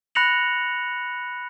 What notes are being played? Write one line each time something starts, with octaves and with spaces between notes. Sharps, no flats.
B5 F#6 A#6 C#7 F7 F#7